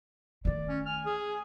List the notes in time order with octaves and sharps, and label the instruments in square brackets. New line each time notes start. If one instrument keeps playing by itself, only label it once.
[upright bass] D#3 A3 [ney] D5
[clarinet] C#4
[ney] G#5 [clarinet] F6
[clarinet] G#4